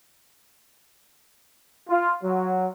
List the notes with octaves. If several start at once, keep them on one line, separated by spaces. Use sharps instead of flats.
F4
F#3